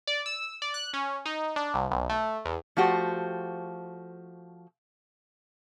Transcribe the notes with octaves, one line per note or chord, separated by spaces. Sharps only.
D5
E6
D5
F#6
C#4
D#4
D4
C2
B1
A3
E2
F3 A3 F#4 G4 C5